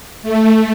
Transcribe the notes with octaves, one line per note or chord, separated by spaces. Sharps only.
A3